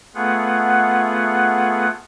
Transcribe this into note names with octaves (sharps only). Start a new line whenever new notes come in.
A3 B3 F4 G#4 F#5